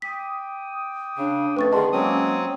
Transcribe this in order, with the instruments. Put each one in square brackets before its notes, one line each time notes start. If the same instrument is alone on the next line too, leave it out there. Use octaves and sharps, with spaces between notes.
[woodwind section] G5 D6 D#6 [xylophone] B6
[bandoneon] C#3 [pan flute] D4
[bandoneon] F2 [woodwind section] A3 C#4 [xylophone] B4 C#6 A6
[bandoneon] D3 D#3 [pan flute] G#4 [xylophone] D#5 A5 C6
[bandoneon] F#3 C4 D#6 [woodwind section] G#3 A#3 [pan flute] C#4